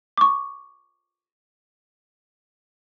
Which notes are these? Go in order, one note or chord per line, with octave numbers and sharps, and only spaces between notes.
C#6 D6